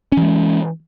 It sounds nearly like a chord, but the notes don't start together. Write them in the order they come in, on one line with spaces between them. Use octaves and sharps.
C#4 E3 G#3